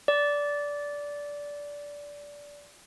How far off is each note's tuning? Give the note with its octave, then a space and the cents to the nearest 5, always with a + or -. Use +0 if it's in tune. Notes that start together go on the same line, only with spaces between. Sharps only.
D5 -15